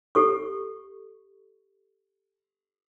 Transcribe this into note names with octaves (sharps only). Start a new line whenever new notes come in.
G4 A4 C#6